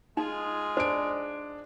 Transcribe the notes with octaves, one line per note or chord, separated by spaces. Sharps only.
G#3 D#4 F4 G#4
D4 C5 D7